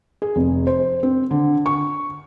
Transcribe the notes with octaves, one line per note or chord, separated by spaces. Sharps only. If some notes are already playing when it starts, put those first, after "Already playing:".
G#4
F1
C5
C4
D3
C#6